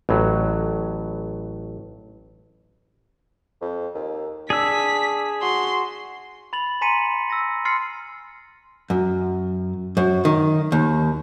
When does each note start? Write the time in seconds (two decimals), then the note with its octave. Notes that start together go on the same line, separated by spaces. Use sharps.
0.09 A1 A2 F#3
3.61 F2
3.95 D#2
4.50 D4 G#4 E6 B6
5.42 F#4 C6
6.53 B5 A6 F#7
6.81 G#5 A#5 C6 B6 C#7 D#7
7.30 E6 A#6
7.65 C6 F6 A6 C7 C#7
8.90 F#2
9.97 F#2
10.25 D#3
10.72 D#2